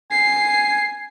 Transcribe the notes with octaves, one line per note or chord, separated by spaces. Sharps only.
G#5 C7